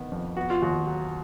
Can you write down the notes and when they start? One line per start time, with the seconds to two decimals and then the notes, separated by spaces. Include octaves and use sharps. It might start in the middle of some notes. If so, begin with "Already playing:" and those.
Already playing: D#3 B3
0.12 F2
0.37 B3 F#4
0.50 F4
0.62 D#2 F#4
0.87 F#3